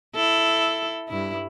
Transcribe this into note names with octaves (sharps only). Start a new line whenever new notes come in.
E4 A4
G2 E4